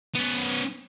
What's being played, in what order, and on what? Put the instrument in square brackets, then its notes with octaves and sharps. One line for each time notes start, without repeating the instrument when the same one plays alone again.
[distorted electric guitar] B3 C#4